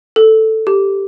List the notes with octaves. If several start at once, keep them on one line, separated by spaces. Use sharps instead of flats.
A4
G4